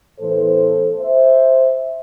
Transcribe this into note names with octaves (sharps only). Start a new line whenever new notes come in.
A2 E3 B3 A4 C5
C5 E5